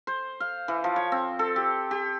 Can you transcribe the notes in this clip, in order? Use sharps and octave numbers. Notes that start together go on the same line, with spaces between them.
C5
F5
E3
F3
C#5
C4
A4
G4
G4